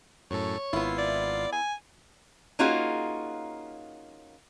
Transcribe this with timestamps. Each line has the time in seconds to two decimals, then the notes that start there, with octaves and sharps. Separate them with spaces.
0.31 F#2 A2 A4 C#5
0.73 G#1 B3 E4 F4 C7
0.98 D5
1.52 G#5
2.59 A#3 C#4 D#4 F4 F#4 G#4